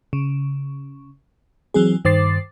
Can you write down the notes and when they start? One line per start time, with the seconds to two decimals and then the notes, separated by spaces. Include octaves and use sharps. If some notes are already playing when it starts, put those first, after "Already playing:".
0.13 C#3
1.74 E3 F#3 C4 G#4
2.05 G2 D#3 C5 D6 A6 C7